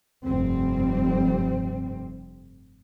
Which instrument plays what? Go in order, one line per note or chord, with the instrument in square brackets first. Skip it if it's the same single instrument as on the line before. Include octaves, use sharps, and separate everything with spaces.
[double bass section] F1 G2 G3 C4